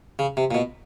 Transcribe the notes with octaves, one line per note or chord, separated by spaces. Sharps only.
C#3
C3
A#2
B2